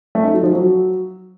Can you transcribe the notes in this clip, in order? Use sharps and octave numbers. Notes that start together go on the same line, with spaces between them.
A3
D#4
F#3
F3
F#3